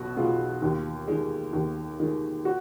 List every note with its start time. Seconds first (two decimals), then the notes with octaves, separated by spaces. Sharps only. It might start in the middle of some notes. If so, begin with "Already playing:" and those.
Already playing: B1 B2 F#4
0.17 B2 G#3 F4
0.62 D#2
1.07 D#3 G#3
1.53 D#2
2.00 D#3 G#3
2.45 F#4